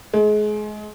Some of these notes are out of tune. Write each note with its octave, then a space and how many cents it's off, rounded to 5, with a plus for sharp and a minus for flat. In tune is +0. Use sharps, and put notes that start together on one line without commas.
G#3 +30